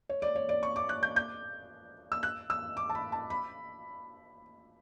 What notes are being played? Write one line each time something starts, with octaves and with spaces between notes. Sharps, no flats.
C#5
D5
C#5
D5
C#6
D6
F#6
G6
G6
E6
F#6
E6
D6
A5
B5
A5
B5